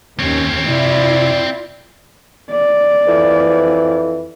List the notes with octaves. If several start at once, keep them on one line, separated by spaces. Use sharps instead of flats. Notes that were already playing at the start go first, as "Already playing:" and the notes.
D#2 C4 C#4 C#5
C3 E4 F4 D5
D5
F2 E3